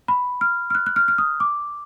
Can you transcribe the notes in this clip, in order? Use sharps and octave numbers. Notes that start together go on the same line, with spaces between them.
B5
F6
F6
F#6
F#6
F6
F6
D#6
D6